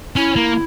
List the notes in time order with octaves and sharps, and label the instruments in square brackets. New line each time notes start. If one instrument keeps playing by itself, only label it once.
[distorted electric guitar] C#4 [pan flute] E4
[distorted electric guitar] A#3